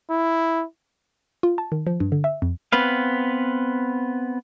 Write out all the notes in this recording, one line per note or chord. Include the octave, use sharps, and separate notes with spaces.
E4
F4
A5
D#3
F3
G2
D3
E5
F2
B3 C4 B4 F5